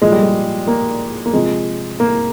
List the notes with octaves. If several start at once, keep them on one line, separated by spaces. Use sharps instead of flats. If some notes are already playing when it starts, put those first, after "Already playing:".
A#2 F3 G#3
G3
G#3
A#3
A#3
C3 F3 G#3
A#3